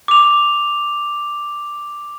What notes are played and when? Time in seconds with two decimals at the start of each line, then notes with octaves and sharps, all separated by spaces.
0.08 D6 F7